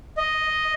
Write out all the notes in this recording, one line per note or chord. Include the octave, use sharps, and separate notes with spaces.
D#5